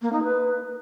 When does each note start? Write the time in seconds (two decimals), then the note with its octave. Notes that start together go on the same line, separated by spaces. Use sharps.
0.02 A#3
0.13 D#4
0.24 B4